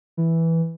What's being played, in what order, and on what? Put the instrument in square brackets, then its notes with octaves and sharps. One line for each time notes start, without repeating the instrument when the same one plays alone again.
[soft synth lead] E3